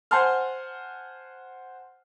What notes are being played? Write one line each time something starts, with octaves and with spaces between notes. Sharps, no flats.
C5 F#5 G#5 A5 C6 F6